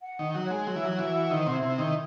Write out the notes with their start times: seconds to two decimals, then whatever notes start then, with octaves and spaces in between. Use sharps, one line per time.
0.02 F#5
0.19 D#3 D#4
0.35 F#3
0.46 G#3 C#5
0.67 F#3 C#5
0.76 E3
0.85 F#3 F#4
0.98 E3
1.09 F#5
1.30 D#3 C5
1.46 C3 E4
1.63 C3
1.73 E4
1.78 D#3